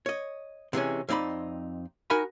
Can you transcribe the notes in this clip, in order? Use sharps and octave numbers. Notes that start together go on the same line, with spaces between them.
C#5 D#5
C3 E3 G#3 C#4
F2 C4 D#4 D5 B5
D#4 F#4 A#4 G#5 A#5 B5